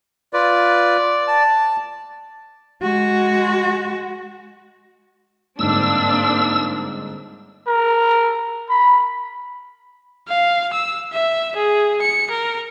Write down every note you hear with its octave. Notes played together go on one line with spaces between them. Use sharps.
F4 B4 D5
A5
G#3 F#4
G1 G#2 A#3 C4 D4 E6
A#4
B5
F5
E6
E5
G#4
C#7
A#4